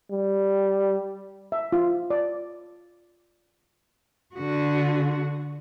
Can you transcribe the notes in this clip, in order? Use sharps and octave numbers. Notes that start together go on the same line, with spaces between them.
G3
E5
F4
D5
D3 F#4